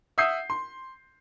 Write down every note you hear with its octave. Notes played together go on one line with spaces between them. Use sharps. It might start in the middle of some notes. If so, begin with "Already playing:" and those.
E5 F#5 D#6 E6 G6 C7
C6